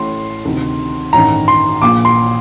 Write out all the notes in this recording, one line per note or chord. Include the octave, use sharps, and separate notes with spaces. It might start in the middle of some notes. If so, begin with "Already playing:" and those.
Already playing: A1 A2 C6
D2 C3 D#3
A1 G2 D#3 A#5
C6
A#1 A#2 D6
C6